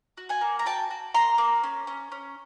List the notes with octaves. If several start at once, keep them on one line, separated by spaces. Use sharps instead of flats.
F#4
F#5 G#5
A#3
A#5
F#4 G5 A5
F#4
A#3 A#5 C6
A#3
C#4
C#4
C#4